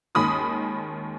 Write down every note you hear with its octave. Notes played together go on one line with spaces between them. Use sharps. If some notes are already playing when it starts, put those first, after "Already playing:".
D#2 D#3 G#3 C#4 B5 D#6